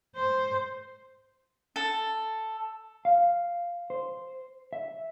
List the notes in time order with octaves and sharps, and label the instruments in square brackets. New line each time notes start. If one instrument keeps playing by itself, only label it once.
[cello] C5
[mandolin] A4
[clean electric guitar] F5
C5
E5